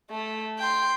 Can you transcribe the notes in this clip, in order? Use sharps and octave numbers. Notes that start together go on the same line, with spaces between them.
A3
G5 C6